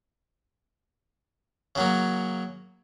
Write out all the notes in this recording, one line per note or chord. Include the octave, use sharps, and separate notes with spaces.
C#3 F#3 A#3